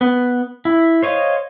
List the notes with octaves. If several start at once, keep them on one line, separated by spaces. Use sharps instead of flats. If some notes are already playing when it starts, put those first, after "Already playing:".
B3
E4
C5 C#5 D#5 F5